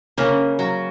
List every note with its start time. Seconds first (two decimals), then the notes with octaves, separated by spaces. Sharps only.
0.18 C#3 A#3 C#4
0.59 F#3